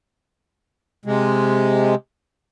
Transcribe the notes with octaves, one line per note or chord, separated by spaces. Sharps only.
C3 G#3